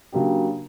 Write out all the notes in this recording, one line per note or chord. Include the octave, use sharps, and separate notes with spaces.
C#3 F#3 A#3 D4 G4